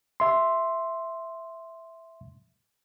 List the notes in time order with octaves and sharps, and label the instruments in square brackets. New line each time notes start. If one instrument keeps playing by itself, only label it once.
[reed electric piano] E5 C6